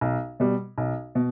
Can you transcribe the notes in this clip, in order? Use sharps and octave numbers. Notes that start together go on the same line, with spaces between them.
B1
B2 G3
B1
B2